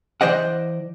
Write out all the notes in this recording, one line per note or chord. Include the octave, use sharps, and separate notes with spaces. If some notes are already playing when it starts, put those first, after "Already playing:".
E3 C5 D5 D#5 F#5